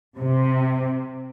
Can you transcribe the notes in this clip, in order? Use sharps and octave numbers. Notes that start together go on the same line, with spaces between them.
C3